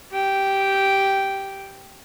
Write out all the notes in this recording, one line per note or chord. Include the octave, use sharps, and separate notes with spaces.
G4 G5